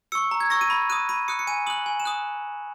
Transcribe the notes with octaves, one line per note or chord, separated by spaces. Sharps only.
C#6 E6 C#7
A#5
G#6
C#6 E6 A#6
D#7
B5
D#6 F#6 D#7
B5 D#7
D#6 F#6 C#7
C#7
G#5 D#7
D#6 F#6 F#7
G#5
E7
D#6 F#6